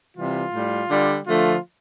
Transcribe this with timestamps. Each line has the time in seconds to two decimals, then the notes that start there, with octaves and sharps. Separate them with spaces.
0.16 C3 E3 G3 F4
0.53 A2 G3
0.90 D3 G3
1.26 D3 F3 A3 F4